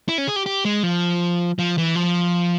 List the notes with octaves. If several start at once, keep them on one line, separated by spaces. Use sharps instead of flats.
E4
C#4
G#4
G4
G4
G#3
F3
F3
E3
F3